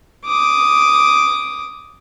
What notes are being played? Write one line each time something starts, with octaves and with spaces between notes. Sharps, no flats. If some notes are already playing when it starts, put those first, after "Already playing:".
D6 D#6